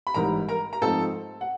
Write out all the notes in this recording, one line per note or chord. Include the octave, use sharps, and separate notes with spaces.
B5
A1 G#2 E3 G3 A#4 A#5
A#4 A#5
A#5
G#2 F3 A3 C4 D#4 A4 A5
F#5